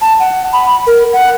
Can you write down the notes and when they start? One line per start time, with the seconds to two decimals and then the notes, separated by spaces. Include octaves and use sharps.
0.01 A5
0.20 F#5
0.53 B5
0.87 A#4
1.13 F#5